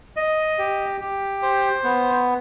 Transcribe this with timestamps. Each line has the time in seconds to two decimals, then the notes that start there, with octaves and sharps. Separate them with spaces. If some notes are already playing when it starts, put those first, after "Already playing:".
0.17 D#5
0.59 G4
1.01 G4
1.42 C5
1.84 B3